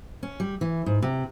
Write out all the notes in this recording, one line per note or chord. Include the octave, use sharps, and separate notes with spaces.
C#4
G3
E3
G#2
C3